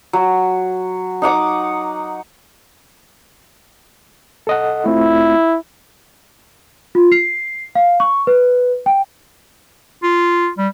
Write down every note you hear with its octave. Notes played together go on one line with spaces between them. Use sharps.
F#3
D#4 F#5 D6 D#6
A4 D#5 F#5
A3 C4 E4 F4
F4
C7
F5
C#6
B4
G5
F4
G3